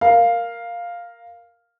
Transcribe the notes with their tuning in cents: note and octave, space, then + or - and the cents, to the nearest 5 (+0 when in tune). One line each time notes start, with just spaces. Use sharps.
A#4 +0 F5 +0